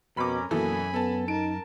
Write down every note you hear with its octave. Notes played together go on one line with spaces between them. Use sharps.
F2 B2 C#4 A#4 A#5 B5 D6
F#2 B2 E3 A#3 A4 G#5 B5
B3 A4 A5
D#4 A#4 A5 D7